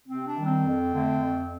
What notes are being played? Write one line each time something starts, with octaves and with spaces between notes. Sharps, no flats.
C3 C4
D4
D#3 G3
C4
F2
D3 A3
F2